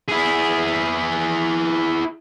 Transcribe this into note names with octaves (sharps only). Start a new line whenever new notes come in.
E4 G#4